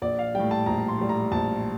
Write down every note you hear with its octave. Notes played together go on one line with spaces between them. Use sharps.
A#1 D5
F5
A2 G3 G5
A5
A#1 A#5
C6
A2 G3
A#5
A#1 A5